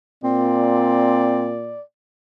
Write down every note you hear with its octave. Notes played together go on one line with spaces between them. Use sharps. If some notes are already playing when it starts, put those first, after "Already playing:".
A#2 C4 D5